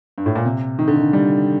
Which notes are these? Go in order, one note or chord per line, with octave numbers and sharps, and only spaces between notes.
G2
A2
A#2
C3
D#3
D3
D#3
G3